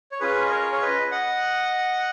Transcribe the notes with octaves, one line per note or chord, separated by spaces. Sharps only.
C#5
C#4 F4 G#4 B4
D#5
A#4 C#5
C#5
B4 D#5
D#5 F#5